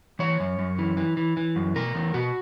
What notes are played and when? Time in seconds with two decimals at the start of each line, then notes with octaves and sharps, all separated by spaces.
0.19 E3 C#5
0.40 F#2
0.59 F#2
0.78 E3
0.97 E3
1.17 E3
1.37 E3
1.56 F#2
1.76 B2 A#4
1.95 E2
2.14 B2 F#4